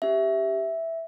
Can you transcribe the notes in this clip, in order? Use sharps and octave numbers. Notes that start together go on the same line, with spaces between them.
C#4 G4 E5